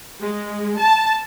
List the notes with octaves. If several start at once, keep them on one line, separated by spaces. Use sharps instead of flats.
G#3
A5